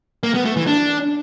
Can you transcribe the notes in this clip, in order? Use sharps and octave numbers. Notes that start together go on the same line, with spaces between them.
A#3
B3
A3
E3
D4